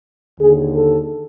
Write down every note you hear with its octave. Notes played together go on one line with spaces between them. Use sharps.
D#2 D3 G#4
A4